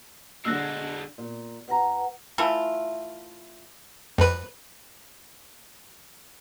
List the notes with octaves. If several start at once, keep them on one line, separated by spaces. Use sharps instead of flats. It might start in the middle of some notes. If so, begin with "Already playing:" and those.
D3 G#3 D4 E6 F#6 A#6
A#2
F2 B4 F#5 A#5
E3 A3 E4 F4
F2 B4